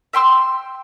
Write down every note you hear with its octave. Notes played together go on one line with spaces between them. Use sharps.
E5 G5 C6 E6